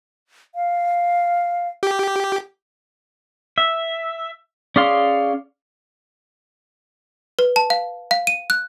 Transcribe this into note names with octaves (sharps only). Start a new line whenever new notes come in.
F5
G4
E5
C#4 G#4 D5 F5 C6
B4
A5
F5
F5
D#7
F#6